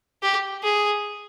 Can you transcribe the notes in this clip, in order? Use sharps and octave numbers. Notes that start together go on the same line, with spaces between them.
G4
G#4